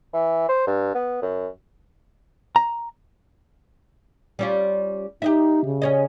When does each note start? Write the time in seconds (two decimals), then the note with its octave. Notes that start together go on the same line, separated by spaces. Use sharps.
0.14 E3
0.49 C5
0.67 G2
0.95 B3
1.22 F#2
2.56 A#5
4.39 G3 C#4 F4
5.22 D#4 G4 D#5 E5
5.65 C#3
5.82 C#4 C#5 D#5